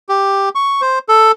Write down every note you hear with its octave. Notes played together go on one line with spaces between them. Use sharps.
G4
C#6
C5
A4